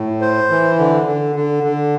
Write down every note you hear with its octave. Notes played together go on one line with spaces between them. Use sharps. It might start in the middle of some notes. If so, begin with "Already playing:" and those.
Already playing: A2
C5
E3
D3
D3
D3
D3